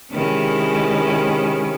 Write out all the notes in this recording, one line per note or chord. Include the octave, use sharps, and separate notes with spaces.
C3 D#3 G#3 C#4 E4